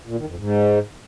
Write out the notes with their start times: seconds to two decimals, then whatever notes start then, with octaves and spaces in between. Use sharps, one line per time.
0.07 A#2
0.17 D#3
0.27 F2
0.38 G#2